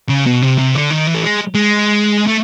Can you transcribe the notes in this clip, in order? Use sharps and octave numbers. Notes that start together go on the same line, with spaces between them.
C#3
B2
C3
C3
D3
D#3
E3
A3
G#3
G#3
A3